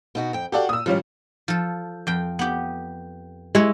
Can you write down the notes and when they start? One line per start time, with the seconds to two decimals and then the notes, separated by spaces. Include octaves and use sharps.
0.15 B2 D#4 F#4
0.33 F2 G5
0.52 F#4 G4 A4 D5 F5 F#5
0.69 A#2 D#6 E6
0.86 G#2 D#3 F3 G3 C#4
1.48 F3 A4
2.07 F2 G5
2.39 B3 G4
3.55 G#3 E4 B4 C#5